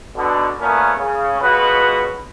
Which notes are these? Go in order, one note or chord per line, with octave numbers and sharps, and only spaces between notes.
B2 D3
A#2 A3 B3 C#4 A#4
C#3
C#2 B2 F#4 B4